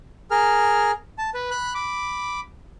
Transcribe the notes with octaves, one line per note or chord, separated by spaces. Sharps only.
G#4 A#4 F6
A5
B4
B5 F#6
B5 D6